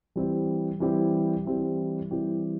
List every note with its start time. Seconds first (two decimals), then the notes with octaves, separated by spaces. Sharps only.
0.16 E3 G3 C4 E4 G4
0.80 E3 G3 C4 E4 G4
1.45 E3 G3 C4 E4 G4
2.11 E3 G3 C4 E4 G4